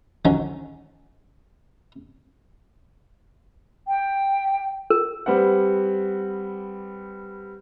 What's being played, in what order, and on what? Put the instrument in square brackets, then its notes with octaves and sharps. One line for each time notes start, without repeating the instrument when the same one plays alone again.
[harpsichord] D3 D#3 F3 F#3 C#4
[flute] G5
[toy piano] A#4
[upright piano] G3 C4 B4 F#5